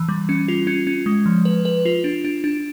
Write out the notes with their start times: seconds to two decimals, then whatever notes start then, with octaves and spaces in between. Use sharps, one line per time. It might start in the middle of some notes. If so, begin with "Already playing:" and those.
Already playing: E3
0.09 G3
0.29 C#4
0.48 F4
0.67 C#4
0.87 C#4
1.06 G#3
1.26 F3
1.45 B4
1.65 B4
1.85 F4
2.04 D4
2.25 D4
2.44 D4